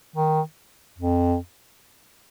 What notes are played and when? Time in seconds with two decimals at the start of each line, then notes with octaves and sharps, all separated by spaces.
0.16 D#3
0.98 F2